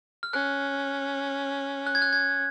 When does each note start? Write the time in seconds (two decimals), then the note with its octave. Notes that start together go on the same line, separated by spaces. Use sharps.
0.23 F6
0.33 C#4 F#6
1.87 F#6
1.95 G#6
2.02 F#6
2.13 G#6